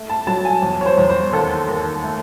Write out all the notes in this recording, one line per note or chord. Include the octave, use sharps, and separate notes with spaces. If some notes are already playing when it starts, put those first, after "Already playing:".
Already playing: A3
A5
F#3 A5
G#5
E2
C#5
C5
E2
C5
D#2 A4
D#2
A3